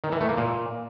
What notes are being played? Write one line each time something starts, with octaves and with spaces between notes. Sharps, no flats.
D#3
E3
A3
A#3
A#2